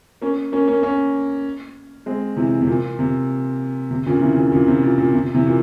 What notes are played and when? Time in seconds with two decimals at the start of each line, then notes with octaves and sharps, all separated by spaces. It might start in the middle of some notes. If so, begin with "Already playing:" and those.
0.22 A#3 C#4
0.52 A#3 C#4
0.68 A#3 C#4
0.83 A#3 C#4
2.06 G#3 C4
2.37 C3 E3
2.62 C3
2.67 A#2
2.99 C3
3.91 C3
4.06 A#2 C#3
4.21 C3 E3
4.36 A#2 C#3
4.52 A#2 C#3
4.67 C3
4.83 A#2
4.98 A#2
5.14 C3
5.34 C3 E3
5.47 A#2